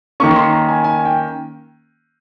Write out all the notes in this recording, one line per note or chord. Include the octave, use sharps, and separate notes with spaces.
D#3 A#3 C#4 C#6
C#6
C6
A#5
G#5
G#5
G5